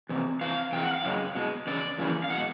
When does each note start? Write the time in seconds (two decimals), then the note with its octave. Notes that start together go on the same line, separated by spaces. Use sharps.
0.09 E2 C3
0.41 C3 E3 F5
0.73 C3 E3 G#3 G5
0.83 F#5
0.94 F5
1.04 F#2 C#3 G#3
1.35 B2 G#3
1.67 E2 C#3 D5
1.98 F#2 C#3 E3 G3 A#3
2.24 F5
2.30 B2 G#3 F#5